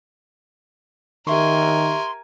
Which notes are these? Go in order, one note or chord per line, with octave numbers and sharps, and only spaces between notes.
D#3 G4 A#4 E5 G#5 C6 C#6